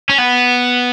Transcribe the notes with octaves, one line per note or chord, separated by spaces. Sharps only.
C#4
B3